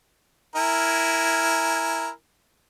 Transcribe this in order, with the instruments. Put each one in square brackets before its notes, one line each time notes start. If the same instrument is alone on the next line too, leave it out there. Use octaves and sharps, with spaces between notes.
[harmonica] E4 A#4 G#5